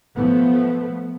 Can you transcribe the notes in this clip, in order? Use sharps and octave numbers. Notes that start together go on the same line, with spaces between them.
F3 A3 B3